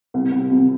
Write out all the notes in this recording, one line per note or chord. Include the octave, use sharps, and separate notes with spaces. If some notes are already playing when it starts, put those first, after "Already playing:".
C2
C2
C3